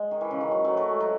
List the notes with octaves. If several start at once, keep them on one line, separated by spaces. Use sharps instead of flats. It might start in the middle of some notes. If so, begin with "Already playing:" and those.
Already playing: G#3
D#3
E3
C#3
D#3
F#3
F#3 A3
F#3 A3
G#3
F#3